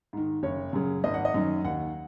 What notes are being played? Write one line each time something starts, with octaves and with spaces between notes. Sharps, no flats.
G#2 D#3
F#1 C#5
F#2 C#3
G#1 D#5
F#5
D#5
F#2 D#3
D#2 F#5